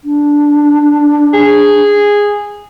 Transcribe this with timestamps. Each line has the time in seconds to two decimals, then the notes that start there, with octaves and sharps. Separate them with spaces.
0.04 D4
1.34 G#4